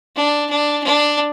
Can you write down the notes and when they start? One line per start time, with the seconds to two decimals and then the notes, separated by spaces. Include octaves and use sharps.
0.16 D4
0.50 D4
0.83 D4